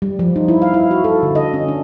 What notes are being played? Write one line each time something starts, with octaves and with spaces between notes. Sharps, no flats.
G3
F3
D#4
E4
F5
E4
F#4
A4
D3
D#5
C#4
D4